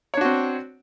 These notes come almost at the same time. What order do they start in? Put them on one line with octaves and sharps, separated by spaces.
C#5 D4 F#4 C4